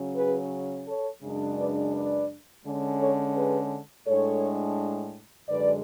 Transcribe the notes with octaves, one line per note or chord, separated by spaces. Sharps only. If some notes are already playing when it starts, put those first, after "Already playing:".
Already playing: C#3 F#3 C#4
G#4 B4
A4 C#5
F#2 C#3 G#3 D4
B4 D5
B4 D5
D3 G#3 C#4
A4 C#5
G#4 B4
A2 G#3 D4 A4 C#5
F#2 D3 G#3 B4 D5